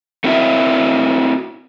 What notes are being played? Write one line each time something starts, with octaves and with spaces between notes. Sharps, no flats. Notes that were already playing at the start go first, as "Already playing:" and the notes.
A3 C4 E4 F#4 A#4 E5